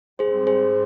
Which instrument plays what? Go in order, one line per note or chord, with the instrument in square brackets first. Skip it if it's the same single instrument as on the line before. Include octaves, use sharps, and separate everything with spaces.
[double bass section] G#2 G3 C4 [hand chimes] G#4 C5
[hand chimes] G#4 C5